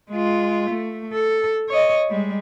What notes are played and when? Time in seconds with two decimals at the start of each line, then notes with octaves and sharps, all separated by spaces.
0.10 G#3 F4
0.70 A3
1.12 A4
1.69 C#5 D#5
2.09 G3 G#3